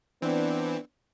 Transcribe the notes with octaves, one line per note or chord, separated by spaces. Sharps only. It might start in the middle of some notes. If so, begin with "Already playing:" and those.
E3 B3 C4 D4